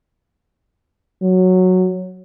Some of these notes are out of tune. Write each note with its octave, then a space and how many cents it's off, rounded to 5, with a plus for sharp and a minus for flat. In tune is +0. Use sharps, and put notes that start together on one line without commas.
F#3 -5